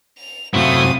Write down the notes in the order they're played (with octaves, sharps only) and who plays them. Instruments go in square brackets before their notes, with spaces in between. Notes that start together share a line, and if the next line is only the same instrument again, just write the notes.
[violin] F7
[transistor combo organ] F#2 C3 [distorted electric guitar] A3 E4 [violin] F5 D#6